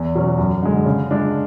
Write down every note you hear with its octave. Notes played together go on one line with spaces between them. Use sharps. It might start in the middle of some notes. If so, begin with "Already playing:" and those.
Already playing: E2
B2 F#3 C#4
F#2
D3 G#3
C#3
G#3 D4